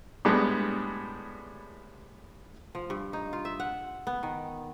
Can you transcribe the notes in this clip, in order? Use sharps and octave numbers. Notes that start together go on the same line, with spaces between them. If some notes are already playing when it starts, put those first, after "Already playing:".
A2 G3 G#3 B3 D4
F3
G2
D#4
F4
E5
F#5
B3
D#3